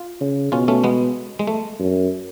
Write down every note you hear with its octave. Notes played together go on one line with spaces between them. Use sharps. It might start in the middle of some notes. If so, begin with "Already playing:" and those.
Already playing: F4
C#3
B2 C#4 F4
A3 C#4
G#3 B3
G#3
A3
F#2